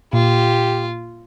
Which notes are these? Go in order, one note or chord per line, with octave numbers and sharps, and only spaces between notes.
A#2 F4 G4